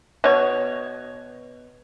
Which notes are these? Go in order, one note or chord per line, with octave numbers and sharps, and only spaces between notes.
B2 C#5